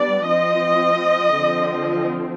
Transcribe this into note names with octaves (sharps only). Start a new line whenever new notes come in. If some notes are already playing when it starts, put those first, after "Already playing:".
Already playing: G3 B3 D4 D5
F3 C4 D#5
D3 F3 C4